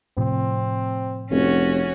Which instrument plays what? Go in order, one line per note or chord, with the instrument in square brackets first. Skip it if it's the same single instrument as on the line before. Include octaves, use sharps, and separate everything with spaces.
[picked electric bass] A2 C3 F3 [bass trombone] C4
[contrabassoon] F1 [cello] C#4 F#4